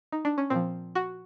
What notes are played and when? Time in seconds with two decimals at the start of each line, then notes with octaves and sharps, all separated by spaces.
0.12 D#4
0.25 D4
0.38 C#4
0.50 A#2 F3 C4
0.95 F#4